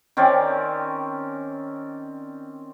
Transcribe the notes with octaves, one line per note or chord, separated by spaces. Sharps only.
D#3 C4 C#4 D5